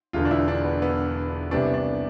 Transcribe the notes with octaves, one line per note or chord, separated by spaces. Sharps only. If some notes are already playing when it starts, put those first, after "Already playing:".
E1 E2 D3 F4
D4
E4
D4
B3
B3
C2 C3 E3 B3 D4
D4